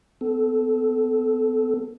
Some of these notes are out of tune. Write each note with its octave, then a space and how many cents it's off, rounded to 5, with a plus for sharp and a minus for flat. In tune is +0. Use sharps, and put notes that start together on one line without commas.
B3 +40 A4 -15